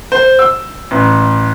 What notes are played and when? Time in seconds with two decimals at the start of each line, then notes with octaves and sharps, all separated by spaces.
0.12 C5
0.39 E6
0.91 A1